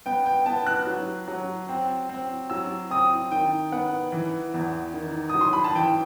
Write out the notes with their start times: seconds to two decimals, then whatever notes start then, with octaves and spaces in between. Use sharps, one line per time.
0.06 B3 G5
0.26 G5
0.46 B3 A5
0.67 F#6
0.87 F#3
1.28 F#3
1.69 C4
2.09 C4
2.50 F#3 E6
2.90 C4 D#6
3.31 D#3 G5
3.72 B3 F#5
4.12 E3
4.54 E2
4.94 D#3
5.29 D#6
5.35 F#3
5.41 C6
5.53 B5
5.64 A5
5.75 E3 G5